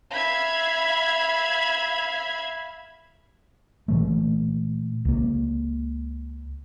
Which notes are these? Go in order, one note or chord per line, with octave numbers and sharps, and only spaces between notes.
E5 F5 B5 G#6
A#2 E3 A3
C#2 A#3